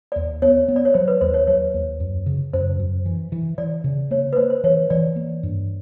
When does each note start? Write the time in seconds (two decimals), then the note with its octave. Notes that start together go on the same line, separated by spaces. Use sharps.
0.12 D5
0.16 D#2
0.42 B3 C#5
0.68 B3
0.76 D5
0.85 C#5
0.94 F#3 C5
1.08 B4
1.21 D#2 C5
1.34 C#5
1.47 F#3 C#5
1.74 D#2
2.00 F#2
2.26 C#3
2.53 F#2 C5
2.79 F#2
3.06 E3
3.32 E3
3.58 E3 D5
3.84 C#3
4.11 A#3 C#5
4.33 B4
4.37 A#3 C5
4.50 C5
4.64 E3 C#5
4.90 E3 D5
5.16 A#3
5.43 G2